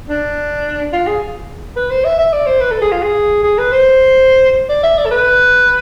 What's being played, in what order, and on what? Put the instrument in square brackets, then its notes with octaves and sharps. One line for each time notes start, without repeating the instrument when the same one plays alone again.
[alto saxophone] D4
F4
G#4
B4
C5
E5
E5
D5
C5
B4
A4
G#4
F4
G#4
G#4
B4
C5
D5
E5
D5
A4
B4